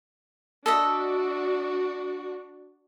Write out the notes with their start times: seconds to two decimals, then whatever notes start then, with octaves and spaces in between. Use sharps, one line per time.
0.66 D4 F#4 A4 D#5 E5